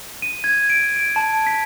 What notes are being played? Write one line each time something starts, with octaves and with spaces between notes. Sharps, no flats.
D#7
G#6
D7
D7
A5
B6